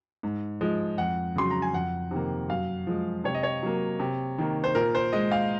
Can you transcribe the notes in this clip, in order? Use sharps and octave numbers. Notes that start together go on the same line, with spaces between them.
G#2
F3 G#3
F2 F#5
C#3 F#3 C6
A#5
G#5
F2 F#5
C3 D#3 A#3
F#2 F5
F3 G#3
C3 C#5
D#5
C#5
F#3 A#3
C3
D#3 A#3
C5
A#2 A#4
C5
G#3 D#5
F5